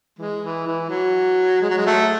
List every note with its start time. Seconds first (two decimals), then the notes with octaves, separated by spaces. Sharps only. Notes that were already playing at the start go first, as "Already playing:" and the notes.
0.19 E3 G#3
0.42 E3
0.67 E3
0.90 F#3
1.62 G#3
1.70 F#3
1.78 G#3
1.86 F#3 A3